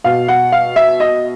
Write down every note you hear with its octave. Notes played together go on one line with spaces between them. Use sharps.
B2 F5
F#5
F5
E5
D#5